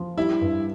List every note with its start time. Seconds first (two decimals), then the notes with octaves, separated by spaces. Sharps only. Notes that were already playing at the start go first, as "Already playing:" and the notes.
Already playing: F3
0.17 G3 E4
0.41 G2